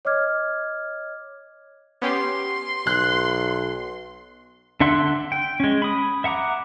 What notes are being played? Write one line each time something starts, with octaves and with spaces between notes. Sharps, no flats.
C#5 D#5 D6 F6 G#6
B3 C#4 G4 C6
B1 F#6
D3 D4 E5 F#5 C6
G5
G#3 C#4
B5 D#6
E5 F#5 A#5 D6